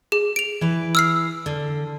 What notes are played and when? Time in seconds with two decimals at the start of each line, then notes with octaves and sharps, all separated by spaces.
0.12 G#4
0.36 D7 F7
0.61 E3 B4
0.95 E6 F6 C7
1.46 D3